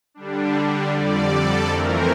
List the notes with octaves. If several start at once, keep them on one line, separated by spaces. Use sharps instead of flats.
D3 G3 D4
F2 D3 G3 D5
A4
F2 E3 A3 C4 A#4